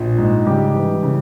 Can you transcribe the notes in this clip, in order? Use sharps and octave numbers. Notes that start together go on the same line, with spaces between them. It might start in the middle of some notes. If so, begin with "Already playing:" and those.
Already playing: A#1 F3
G#2
C#3 G3 G4
E3
C#3